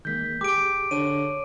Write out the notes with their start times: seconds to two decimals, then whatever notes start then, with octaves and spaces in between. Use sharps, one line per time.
0.05 D#3 G#3 A#3 G6 B6
0.41 G4 G#4 D6 D7
0.91 D3 C#5 D#7